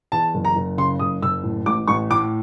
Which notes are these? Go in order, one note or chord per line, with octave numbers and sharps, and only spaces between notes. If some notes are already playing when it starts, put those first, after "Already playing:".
E2 A5
F#1
A#5
F#1
C#3 C6
F#1 D#6
F#1 E6
A2
A1 D6
A1 C#6
A2 D6